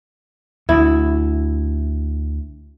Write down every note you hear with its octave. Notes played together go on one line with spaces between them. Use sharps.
D2 E4